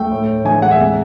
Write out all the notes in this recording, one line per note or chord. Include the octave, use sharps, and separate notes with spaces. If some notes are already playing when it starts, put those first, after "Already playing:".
Already playing: A3 G5
A2
A2
E3 G#5
G#3 F#5
E5
C3